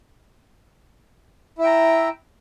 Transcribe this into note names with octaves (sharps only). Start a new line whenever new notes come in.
E4 E5 G5 A#5